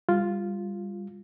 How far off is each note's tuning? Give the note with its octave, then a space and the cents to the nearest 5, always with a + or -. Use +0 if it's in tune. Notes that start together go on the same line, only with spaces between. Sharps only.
G3 +20 F4 -5